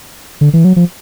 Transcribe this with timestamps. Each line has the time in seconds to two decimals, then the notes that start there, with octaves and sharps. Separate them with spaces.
0.41 D3
0.53 E3
0.65 F#3
0.76 F3